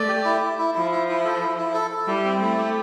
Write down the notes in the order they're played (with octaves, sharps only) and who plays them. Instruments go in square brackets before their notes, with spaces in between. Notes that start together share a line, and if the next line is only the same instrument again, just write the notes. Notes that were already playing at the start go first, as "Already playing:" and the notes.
Already playing: [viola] A3 [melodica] D5
[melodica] G4
E4
E4
E4
[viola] F3 [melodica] E4
[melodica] E4
E4
A4
E4
E4
A4
A4
[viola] G3 [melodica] E4
[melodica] C4
[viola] A3 [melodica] E4
[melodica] G4